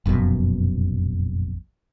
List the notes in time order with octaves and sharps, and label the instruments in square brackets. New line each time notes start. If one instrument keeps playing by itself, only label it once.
[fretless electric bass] F1 A#1 F#2 B2